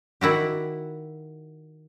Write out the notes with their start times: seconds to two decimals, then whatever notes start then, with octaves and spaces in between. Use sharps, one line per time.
0.21 D#3 E4 F#4 G4